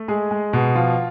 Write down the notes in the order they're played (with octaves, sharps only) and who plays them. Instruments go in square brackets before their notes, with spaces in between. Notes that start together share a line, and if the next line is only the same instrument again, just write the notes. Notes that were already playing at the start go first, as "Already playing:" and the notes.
Already playing: [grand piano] A3
G#3 G#4
G#3
B2
F3 F4